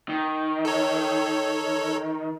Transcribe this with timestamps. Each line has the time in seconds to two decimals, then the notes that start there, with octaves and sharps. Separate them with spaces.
0.09 D#3
0.65 A4 C#5